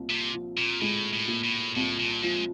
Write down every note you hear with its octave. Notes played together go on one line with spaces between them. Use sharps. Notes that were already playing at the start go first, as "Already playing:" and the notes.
Already playing: C2 A#2
C3
F3
A#2
A2 G#3
A2
A#2
A2
C2 A2
A#2
G#2 F3